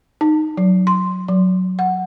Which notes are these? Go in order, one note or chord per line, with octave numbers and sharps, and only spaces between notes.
D#4
F#3
C6
F#3
F#5